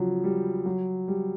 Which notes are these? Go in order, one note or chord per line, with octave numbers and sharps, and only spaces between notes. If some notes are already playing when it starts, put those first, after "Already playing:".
Already playing: C#3 F3 F#3
G3
F#3
G3